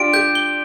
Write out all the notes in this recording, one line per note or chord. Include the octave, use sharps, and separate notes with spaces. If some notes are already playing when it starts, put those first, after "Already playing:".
Already playing: D4 F4 G4 D7
G4 G6
G7